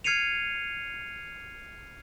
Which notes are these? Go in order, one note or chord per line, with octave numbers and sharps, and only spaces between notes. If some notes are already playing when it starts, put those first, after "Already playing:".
F6 G#6 C7 C#7 D#7 F7